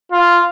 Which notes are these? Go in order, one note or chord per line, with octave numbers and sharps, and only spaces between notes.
F4